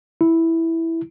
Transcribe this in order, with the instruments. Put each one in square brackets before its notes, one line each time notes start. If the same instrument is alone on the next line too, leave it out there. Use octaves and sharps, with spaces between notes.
[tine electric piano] E4